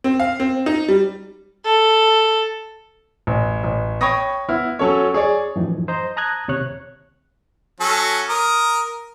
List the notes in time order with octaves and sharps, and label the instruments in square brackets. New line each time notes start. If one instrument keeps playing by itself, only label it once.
[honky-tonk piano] C4
F5
C4
D#4
G3
[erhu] A4
[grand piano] A1
A1
C#5 G5 B5 C#6 D#6 A#6
B3 E4 F6
F#3 C#4 A4 C#5
G#4 C#5 D5
[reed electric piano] F#2 A2 E3 F3 D#4
C5 D#5 A#5
A5 A#5 D#6 F#6 G#6
D#2 C3 C#5 F#6
[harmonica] F#3 C#4 A4
A#4 D#6